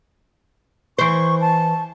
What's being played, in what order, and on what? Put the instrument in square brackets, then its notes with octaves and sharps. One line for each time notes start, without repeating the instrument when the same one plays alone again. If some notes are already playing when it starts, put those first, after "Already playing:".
[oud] E3 C5 [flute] C#6
[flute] A5